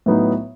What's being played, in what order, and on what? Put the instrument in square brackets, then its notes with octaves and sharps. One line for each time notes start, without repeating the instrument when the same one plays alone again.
[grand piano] A2 F#3 B3 D#4